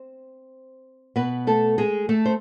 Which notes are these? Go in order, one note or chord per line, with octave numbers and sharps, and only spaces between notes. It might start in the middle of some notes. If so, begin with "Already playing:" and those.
Already playing: C4 C5
B2 B3 B4
A3 A4
G#3 G#4
A3 A4
C5